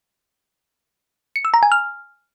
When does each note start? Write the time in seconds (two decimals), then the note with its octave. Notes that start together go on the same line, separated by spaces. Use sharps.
1.36 C#7
1.45 E6
1.54 A#5
1.63 G#5
1.72 F6